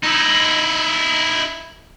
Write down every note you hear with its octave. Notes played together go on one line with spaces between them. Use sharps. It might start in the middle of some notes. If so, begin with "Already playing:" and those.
D#4 E4